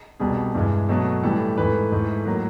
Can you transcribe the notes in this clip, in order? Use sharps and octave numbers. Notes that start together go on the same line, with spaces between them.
C2 B2 G3 G#4
G2 E3 G#3
B2 F#3 A3 A4
A2 E3 G3 A4
G#2 E3 A3 B4
G#2 E3 A3
A2 F#3 A#3